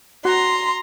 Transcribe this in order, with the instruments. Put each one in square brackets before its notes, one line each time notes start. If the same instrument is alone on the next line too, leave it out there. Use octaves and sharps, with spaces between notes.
[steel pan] F#4 F#5 [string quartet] A#5 C6